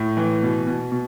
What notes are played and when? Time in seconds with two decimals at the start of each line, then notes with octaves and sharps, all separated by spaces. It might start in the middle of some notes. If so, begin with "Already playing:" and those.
Already playing: A2
0.17 E3
0.42 B2
0.67 B2
0.92 B2